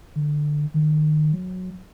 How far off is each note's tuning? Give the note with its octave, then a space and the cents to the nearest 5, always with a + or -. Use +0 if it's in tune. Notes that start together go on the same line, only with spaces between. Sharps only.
D3 +15
D#3 -30
F#3 -10